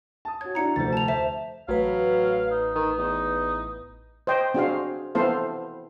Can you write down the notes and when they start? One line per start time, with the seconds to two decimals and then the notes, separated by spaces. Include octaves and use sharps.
0.25 A5 D#6
0.41 F#4 C#5 G#6
0.55 D4 E4 F#4 A#5 C#7
0.76 F1 D2 C5 A6
0.93 A5 F7
1.08 C5 E5 E7
1.68 A1 F#3 B4 F5
2.51 D#4
2.75 D#3
2.98 E2 D#4
4.27 C5 D#5 G5
4.54 C4 D4 F#4 G#4 C5 F5
5.15 B3 C4 E4 A4 C5 F5